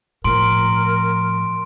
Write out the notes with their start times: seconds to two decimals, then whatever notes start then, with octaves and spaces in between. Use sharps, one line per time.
0.24 A2 F3 A#4 C6 D7